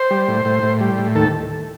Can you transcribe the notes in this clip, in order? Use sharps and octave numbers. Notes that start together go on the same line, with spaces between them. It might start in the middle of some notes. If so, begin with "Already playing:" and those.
Already playing: C5
G3
A2
A2
A2
G3
A2
D#2 A4